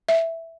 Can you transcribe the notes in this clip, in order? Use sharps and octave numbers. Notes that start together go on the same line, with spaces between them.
E5